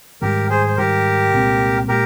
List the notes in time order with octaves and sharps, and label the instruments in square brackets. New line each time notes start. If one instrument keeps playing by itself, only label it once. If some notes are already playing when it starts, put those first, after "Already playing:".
[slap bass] G#2 D#3 G3 [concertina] G4 A#4
[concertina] G#4 C5
C5
[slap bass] G#2 D#3 G3 [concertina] G4 A#4
[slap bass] C2 A#2 G#3 C4
[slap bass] A#2 G#3 [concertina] G4 A#4